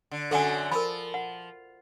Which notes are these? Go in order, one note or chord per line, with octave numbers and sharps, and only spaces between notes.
D3
F#2 D3 F#3 A4 F#5 G#5
F3 A#4 B5
F#5